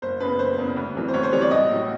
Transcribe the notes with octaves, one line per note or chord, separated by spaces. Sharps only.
F#1 C5
E2 C#3 B4
F#1 C5
E2 C#3
D2
C3 E3 G3
C5
D2 C#5
C5
C3 E3 G3 C#5
D5
A1 D#5
A2 F#3